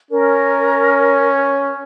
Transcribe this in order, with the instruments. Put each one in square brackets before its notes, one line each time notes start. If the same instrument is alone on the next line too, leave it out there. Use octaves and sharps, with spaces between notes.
[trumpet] C#4 [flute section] A#4